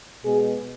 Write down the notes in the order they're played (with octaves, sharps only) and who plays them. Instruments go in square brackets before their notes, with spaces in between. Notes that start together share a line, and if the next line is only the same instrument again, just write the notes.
[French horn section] B2 G#3 G#4